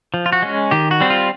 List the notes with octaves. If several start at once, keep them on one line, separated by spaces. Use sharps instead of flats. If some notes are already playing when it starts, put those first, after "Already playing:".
F3
F4
F#4
G#3 C#4
D#3 G4
F#4
G3 C4
F4